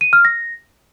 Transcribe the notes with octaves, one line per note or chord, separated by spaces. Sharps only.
D#7
F6
A#6